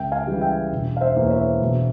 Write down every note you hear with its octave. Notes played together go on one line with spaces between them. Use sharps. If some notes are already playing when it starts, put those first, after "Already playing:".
Already playing: C#2 E5 G5
F5 G#5
C#3 E3 G3
E5 G5
E1
F5
C5 E5
E2 E3 A#3
C#5
C5 E5
E1